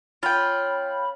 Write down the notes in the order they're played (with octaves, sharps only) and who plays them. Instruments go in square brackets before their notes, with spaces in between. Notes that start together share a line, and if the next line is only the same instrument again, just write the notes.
[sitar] C#4 [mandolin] F4 G5 [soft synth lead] B5